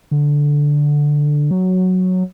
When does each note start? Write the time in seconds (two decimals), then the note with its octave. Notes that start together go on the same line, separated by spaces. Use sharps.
0.11 D3
1.51 F#3